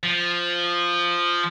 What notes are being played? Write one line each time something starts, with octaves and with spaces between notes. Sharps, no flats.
F3